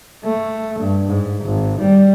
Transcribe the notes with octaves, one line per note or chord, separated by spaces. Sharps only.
A3
G2
G#2
G#1
G3